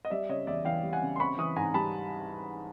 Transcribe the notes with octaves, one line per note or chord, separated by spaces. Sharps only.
D#5
G3 D5 E5
C#3 C#5 D#5
E2 D5 E5
E3 F5 G5
G3
F#5 G#5
C#3
C6
C4 B5 C#6
E3 C#6 D#6
G#2 G#5 A#5
G3 A5 B5